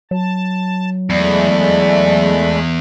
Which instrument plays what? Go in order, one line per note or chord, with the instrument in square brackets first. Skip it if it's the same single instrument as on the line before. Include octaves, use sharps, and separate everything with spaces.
[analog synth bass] F#3 [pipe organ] A5
[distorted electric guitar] E2 [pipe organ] G#3 A3 B5 [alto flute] D5